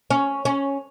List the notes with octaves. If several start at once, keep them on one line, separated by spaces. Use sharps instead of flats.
C#4
C#4